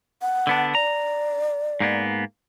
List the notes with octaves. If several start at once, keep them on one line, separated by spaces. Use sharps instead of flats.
F#5
D3 B3 D4
D5 A#5
G#2 A#3 B3